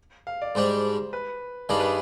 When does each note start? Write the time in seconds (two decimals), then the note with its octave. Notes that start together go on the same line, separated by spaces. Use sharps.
0.27 F5
0.42 D5
0.55 G#2 G3 D4 C5
1.13 B4
1.69 G2 D#3 G3 D4 G#4
1.80 B4